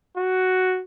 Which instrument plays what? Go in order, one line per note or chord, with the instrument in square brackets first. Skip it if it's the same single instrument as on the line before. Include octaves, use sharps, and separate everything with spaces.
[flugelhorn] F#4